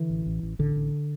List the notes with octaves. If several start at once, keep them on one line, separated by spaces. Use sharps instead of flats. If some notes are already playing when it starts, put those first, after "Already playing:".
Already playing: D3 E3
A1
A1
A1
A1 D3
A1